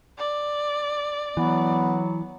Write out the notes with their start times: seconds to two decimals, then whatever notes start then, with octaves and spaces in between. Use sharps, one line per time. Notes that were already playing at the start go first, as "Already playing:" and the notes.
0.19 D5
1.37 E3 F#3 B3